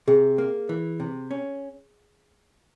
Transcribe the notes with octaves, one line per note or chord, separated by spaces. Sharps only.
C3 G#4
A#3
E3
C3
C#4